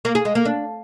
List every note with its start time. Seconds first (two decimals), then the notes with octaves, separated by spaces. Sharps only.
0.05 A#3
0.15 G#4
0.25 G#3
0.35 A#3
0.45 D4